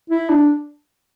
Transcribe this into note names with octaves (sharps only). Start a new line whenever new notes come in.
E4
D4